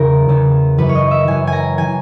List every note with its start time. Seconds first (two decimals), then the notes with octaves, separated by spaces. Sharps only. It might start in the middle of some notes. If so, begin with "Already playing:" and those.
Already playing: E2 C#3 E3 A#4
0.28 E2 C#3 E3
0.78 F#2 E3 B4
0.89 C#5
0.95 D#5
1.11 E5
1.27 F#2 E3 G#5
1.47 G#5
1.53 A#5
1.78 E3 G#5